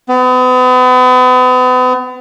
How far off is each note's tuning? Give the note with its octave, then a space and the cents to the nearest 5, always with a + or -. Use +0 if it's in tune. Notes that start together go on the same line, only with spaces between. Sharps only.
B3 +40